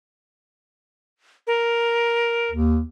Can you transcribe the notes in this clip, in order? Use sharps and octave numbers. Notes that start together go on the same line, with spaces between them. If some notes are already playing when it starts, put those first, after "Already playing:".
A#4
D#2